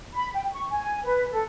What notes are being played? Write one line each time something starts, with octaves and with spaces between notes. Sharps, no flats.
B5
G5
C#6
G#5
B4
A4